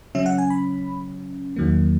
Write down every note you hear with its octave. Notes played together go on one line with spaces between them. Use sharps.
C#3 F#3 C#4 E5
F#5
G#5
B5
E2 D#3 F#3 A#3